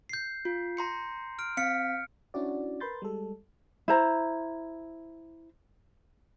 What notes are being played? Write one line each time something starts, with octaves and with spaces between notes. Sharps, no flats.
G6 C7
F4
A#5 C6 C#7
F6 D7
C4 F5 F6 B6 C#7
C#4 D4 E4 F#4 D5
A#4 B4 B5 C6 G6 A6
G3 G#3 A4
E4 C5 A#5